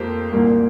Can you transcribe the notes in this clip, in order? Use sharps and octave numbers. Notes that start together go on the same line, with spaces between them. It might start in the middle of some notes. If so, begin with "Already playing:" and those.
Already playing: F2 A#3 G4 C5
C2 A#2 G3 A#3